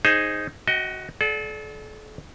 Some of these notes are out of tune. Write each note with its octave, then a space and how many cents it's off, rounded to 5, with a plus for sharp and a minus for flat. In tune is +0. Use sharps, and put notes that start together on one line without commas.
D#4 +0 G#4 +0 C5 +15
F#4 +5 D#5 +25 G5 -30
A4 -40 D5 +0 F#5 +10